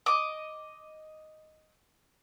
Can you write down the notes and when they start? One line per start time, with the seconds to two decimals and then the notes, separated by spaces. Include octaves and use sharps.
0.06 D#5 D6